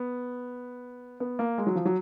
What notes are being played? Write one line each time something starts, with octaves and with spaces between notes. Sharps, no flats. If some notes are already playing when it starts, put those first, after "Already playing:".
Already playing: B3
B3
A#3
G#3
F#3
F3
F#3